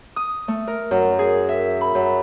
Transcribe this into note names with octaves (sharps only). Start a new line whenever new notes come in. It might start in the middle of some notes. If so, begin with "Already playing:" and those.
D#6
A3
A#4
F#2
G#4
E5
B5
F#2